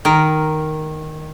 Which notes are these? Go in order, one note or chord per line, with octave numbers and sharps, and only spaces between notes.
D#3 A#4